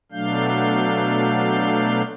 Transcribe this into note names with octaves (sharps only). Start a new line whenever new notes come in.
B2 F#3 A3 D4 F5 G6